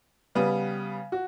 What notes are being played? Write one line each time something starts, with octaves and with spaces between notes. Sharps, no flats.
C#3 G3 B3
F#4